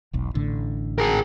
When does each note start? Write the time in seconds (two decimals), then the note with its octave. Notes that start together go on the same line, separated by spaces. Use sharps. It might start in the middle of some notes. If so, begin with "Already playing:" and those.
0.13 E1 B1
0.35 A1 A2 D3
0.99 G#4 A#4